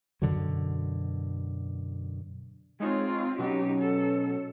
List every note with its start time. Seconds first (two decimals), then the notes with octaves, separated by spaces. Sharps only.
0.22 F#2 B2 D3 F#3
2.80 G#3 C4 D#4 F4 C#5
3.39 B2 F#3 C#4 D#4 G4
3.80 A4